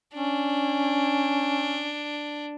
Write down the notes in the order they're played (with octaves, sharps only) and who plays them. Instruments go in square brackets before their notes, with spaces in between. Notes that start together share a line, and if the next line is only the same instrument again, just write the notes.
[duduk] C#4 [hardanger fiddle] D4